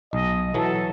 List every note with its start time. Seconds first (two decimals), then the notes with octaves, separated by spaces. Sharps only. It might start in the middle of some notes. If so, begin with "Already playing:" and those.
0.13 B1 D#5
0.54 E3 F#3 A4